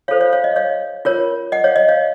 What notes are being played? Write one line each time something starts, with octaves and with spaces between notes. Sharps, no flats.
F4 A4 C5 C#5 F5
C#5 F5
C#5 F5
D#5
C#5 F5
F4 A#4 C#5
D#5 F#5
C#5 F5
D#5
C#5 F5